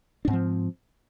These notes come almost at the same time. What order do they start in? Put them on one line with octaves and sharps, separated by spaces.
D4 G#2 C4 F3